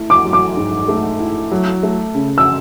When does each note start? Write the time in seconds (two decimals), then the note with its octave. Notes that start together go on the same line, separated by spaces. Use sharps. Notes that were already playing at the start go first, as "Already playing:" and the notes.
Already playing: A3 E4
0.10 D6
0.25 F#3
0.33 D6
0.57 G#2
0.88 A3
1.20 E4
1.52 F#3
1.83 A3
2.15 C#3
2.38 E6